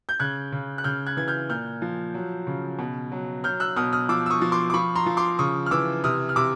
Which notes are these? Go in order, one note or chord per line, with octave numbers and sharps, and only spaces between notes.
G6
C#3 F#6 G#6
C#3
F#6
C#3 F6 G6
F#6 G#6
E3 G#6
F6 G6
A#2 F6 G6
F3
F#3
C#3
B2
F#3
F#3 F6 G6
E6 F#6
B2 D#6 F6
D#6 F6
F3 D6 E6
E6
C#6 D#6
F3
C6 D6
D6
F3 B5 C#6
A#5 C6
F3
C6 D6
C#3 C#6 D#6
F6
E3 D6 E6
C3 D#6 F6
F6
C3 D6 E6